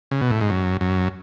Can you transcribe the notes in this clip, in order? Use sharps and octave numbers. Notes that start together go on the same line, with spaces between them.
C#3
B2
A2
G#2
F#2
F#2